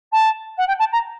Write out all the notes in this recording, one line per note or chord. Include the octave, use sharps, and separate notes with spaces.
A5
F#5
G5
A5
A#5